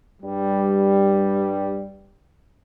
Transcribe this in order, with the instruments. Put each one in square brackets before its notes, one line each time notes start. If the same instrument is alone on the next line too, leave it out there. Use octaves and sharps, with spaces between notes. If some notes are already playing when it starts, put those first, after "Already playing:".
[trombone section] G2 G3